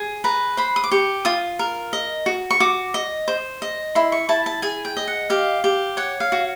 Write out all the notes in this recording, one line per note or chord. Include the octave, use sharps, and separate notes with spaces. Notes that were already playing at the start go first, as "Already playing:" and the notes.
Already playing: G#4
B4 A#5
C5 B5
D#6
D6
G4 C#6
F4 D#6
A#4
D#5
F#4
C#6
F#4 D6
D#5
C5
D#5
E4 C6
C#6
E4 A5
A5
G#4 G#5
G5
D#5
F#5
G4 F5
G4
C#5 F#5
F5
F#4